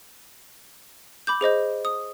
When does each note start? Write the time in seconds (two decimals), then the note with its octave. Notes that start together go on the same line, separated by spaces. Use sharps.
1.27 B5 D6 G6
1.41 G#4 C5 D#5 G6
1.85 D#6